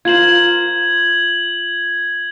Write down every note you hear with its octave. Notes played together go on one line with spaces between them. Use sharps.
F4 A#4 C5 G#6 F#7